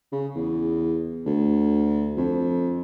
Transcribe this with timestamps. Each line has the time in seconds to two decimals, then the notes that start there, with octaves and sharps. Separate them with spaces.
0.12 C#3
0.35 E2
1.26 D2
2.17 F2